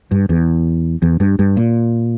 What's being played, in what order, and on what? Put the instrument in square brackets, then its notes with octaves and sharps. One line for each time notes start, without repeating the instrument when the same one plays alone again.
[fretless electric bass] G2
E2
E2
G2
G2
A#2